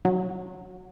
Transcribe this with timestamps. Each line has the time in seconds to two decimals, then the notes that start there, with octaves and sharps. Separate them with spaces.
0.05 F#3